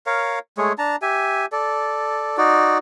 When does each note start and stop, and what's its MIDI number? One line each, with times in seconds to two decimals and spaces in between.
0.06 0.39 70
0.06 0.39 73
0.06 0.39 77
0.58 0.73 56
0.58 0.73 57
0.58 0.73 68
0.58 0.73 73
0.78 0.96 62
0.78 0.96 81
0.78 0.96 82
1.02 1.46 67
1.02 1.46 76
1.02 1.46 80
1.52 2.37 69
1.52 2.37 74
2.37 2.78 63
2.37 2.78 66
2.37 2.78 74